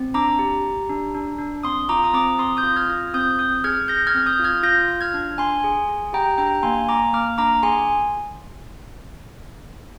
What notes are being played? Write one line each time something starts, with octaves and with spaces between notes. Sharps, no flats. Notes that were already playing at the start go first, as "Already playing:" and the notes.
Already playing: C4
D4 A#5 D6
G4
G4
D4
D4
D4
C4 C6 D#6
F4 A#5 D6
D#6
C4 A#5 D6
C4 C6 D#6
D#6 G6
F4
F6 G#6
F4
C4 D#6 G6
C4 D#6 G6
G#4 F6 G#6
G#4 G6 A#6
F6 G#6
C4
D#6 G6
F4
F6 G#6
F4 G6 A#6
F4
F6 G#6
D4
D4 G#5 C6
G#4
G#4
G4 G5 A#5
D4 G5 A#5
A#3 G#5 C6
A#3 A#5 D6
A#3 D6 F6
D4 A#5 D6
G#4 G#5 C6